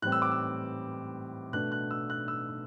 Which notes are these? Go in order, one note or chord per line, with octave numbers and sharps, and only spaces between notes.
A2 E3 G3 C4 F#6
E6
D6
E6
B2 A3 D4 F#6
F#6
E6
F#6
E6